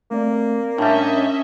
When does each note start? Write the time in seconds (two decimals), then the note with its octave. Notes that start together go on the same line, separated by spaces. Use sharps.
0.11 A3 A#3 C4 D5
0.78 A2 G3 C#4 D4 D#5 E5